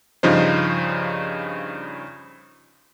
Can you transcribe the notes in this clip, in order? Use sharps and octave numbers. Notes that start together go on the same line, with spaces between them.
G2 C#3 F3 D#4 C5